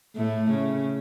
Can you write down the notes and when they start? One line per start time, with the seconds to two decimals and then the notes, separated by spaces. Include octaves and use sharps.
0.15 A2 A3
0.50 C#3 C#4